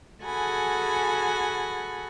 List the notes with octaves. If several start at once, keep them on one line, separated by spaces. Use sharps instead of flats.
F#4 G#4 A4 F#5 G#5 B5